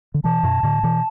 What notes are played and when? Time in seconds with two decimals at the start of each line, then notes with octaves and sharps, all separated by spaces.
0.14 D3
0.24 B2 E3 A5
0.43 F#2 B2
0.63 A2 D3
0.83 B2 E3